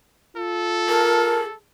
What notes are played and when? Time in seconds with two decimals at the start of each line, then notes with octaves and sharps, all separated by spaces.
0.37 F4 A4
0.89 G#4 A#4 A5